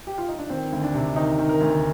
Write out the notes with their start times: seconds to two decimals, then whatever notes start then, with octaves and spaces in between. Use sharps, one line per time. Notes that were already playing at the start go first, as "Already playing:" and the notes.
0.07 G4
0.18 F4
0.28 D#4
0.39 D4
0.50 D#3 C4
0.72 D2
0.83 D4
0.94 C3
1.16 D#3 D#4
1.39 D#3
1.49 A#4
1.61 D2